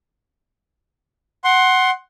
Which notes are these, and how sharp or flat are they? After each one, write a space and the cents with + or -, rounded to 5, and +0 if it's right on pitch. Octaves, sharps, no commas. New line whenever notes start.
F#5 +10 C6 +15